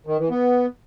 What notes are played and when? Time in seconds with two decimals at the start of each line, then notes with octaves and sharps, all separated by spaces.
0.07 D#3
0.19 E3
0.30 B3